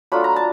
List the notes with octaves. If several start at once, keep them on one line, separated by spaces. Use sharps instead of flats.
F#3 A3 D4 F4 B5
A#5
A5